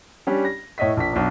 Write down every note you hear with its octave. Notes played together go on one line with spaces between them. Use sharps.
G3 C#4 D4
A#6
A2 C#5 D#5 E5 B6
A#1 B6
B1 D4